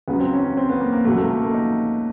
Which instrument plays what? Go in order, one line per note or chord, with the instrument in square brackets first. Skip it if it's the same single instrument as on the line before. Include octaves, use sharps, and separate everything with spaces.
[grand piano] C#2 C#3 F#3 B3
C4
C#4
C#4
C4
B3
A#3
A#3
C#2 B2 F#3 A3
A#3
A3
A#3
D#4